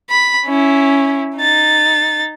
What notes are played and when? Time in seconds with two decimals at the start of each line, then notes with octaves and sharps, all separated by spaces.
0.10 B5
0.45 C#4 E4
1.37 D#4 A6